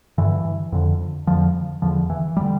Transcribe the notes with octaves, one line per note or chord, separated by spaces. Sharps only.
G2 D3 E3
F2 D3
F2 D3 F3
E2 D3 F3
E3
D3 G3